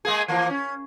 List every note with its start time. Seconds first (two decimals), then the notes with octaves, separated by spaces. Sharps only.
0.05 G#3 A#3 G#4
0.28 E3 F3 A#3
0.50 C#4